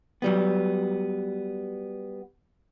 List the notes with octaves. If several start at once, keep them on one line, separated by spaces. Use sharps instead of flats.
F#3 G3 B3